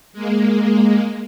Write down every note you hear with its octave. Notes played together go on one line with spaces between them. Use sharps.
G#3 A#3